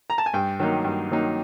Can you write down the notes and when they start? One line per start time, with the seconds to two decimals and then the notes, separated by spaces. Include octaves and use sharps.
0.10 A#5
0.18 A5
0.26 G#5
0.34 G2 G5
0.59 D#3 F#3 A#3 D#4
0.84 G2
1.11 D#3 F#3 A#3 D#4